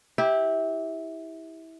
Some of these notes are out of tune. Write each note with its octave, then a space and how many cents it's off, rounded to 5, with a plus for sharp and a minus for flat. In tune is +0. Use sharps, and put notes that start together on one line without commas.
E4 -20 G4 +5